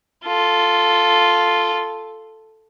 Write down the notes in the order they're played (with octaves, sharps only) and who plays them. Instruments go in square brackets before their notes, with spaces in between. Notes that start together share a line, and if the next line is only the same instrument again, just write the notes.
[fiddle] F4 A4